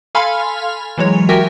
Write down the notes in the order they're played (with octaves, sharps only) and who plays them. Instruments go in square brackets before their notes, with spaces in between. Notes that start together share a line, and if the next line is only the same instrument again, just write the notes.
[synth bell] A4 F5 G#5 B5 C6 F6
E3 F#3 G#3 C#5
F#4 G4 A#4 E5 G5 G#5